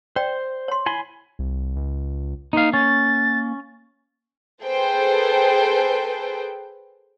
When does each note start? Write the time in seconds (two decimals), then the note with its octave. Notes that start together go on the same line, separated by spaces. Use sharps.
0.16 C5 D5 G5
0.68 C#5 C6
0.86 E4 G#5 B5 C6
1.39 C2
1.77 C#2
2.53 A#3 D#4 F5
2.73 C#4 A6
4.64 G#4 A4 B4 C5 G5